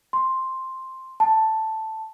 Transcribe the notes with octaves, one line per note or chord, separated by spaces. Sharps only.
C6
A5